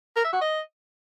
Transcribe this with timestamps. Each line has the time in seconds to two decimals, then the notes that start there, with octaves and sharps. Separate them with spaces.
0.16 A#4
0.24 E5
0.33 F#4
0.41 D#5